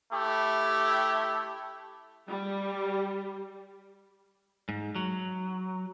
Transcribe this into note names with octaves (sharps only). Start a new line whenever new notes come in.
A3 E4 G4
G3
G#2
F#3